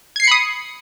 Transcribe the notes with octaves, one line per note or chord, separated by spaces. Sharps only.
B5 D#6 G#6 C7 C#7